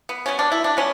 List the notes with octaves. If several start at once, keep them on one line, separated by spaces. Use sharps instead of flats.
B3
B2 G3 B3 C#4
D4
E4
D4
G3 B3 C#4